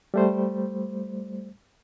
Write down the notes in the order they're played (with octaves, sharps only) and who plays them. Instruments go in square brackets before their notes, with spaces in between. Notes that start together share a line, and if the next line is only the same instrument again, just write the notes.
[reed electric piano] G3 A3 C5